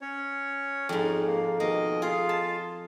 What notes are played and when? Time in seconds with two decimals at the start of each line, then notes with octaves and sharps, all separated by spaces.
0.01 C#4 C#5
0.89 F2 G#2
1.27 A#3
1.60 B2 D#3 A#3 D#5
2.02 F4 G#4 F5
2.29 A5